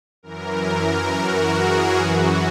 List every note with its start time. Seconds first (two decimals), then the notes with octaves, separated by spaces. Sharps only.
0.23 F#2 E3 A#4
0.66 A#4
1.10 F#4
1.55 G#4
1.98 F#2 E3 F#4